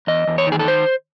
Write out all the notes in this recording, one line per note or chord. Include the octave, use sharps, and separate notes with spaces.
E2 D#5
E2
C#5
D#3 G#4
A4
C5